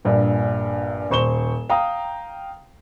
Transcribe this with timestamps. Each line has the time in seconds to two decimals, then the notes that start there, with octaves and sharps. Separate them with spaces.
0.05 A#1 G2 A#2
1.10 D#1 C5 C#6 E7 G7
1.69 F5 G5 A#5 D#6